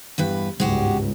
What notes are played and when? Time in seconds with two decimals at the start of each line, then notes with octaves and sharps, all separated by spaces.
0.18 E2 G2 B4
0.60 G1 C#2 G#2 G#3 F#4 G4